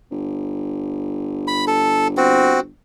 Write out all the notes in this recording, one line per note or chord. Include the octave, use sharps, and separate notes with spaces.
G1
B5
A4
C4 F#4